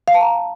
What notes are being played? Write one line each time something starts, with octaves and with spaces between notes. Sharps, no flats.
F5
A5
A#5